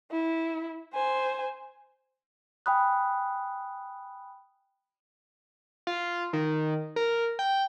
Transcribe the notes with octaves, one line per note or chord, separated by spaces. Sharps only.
E4
C5 G#5
G5 G#5 B5 D#6 F#6
F4
D#3
A#4
G5